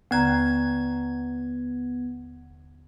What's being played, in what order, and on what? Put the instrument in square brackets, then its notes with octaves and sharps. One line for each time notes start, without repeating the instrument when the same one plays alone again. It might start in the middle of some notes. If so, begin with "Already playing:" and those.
[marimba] D#2 D3 A#5 [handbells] B3 G#6